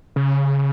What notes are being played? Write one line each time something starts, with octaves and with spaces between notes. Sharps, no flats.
C#3